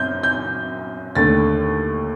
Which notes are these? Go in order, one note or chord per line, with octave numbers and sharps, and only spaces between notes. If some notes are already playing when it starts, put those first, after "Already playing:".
Already playing: F#2 G6
G6
D#2 D3 A3 A6